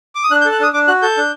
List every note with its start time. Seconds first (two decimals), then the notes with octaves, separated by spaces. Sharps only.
0.15 D6
0.23 D#6
0.31 D4 F#6
0.41 G6
0.46 A4
0.52 F#6
0.60 D4 D#6
0.73 D4 D6
0.87 F#4 F#6
1.02 A4 G6
1.17 D4